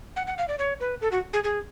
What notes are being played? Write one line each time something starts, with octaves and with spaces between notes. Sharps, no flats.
F#5
F#5
F5
D5
C#5
B4
A4
F#4
G#4
G#4